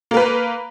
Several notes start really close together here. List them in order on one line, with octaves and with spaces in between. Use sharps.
A#3 A#4 B4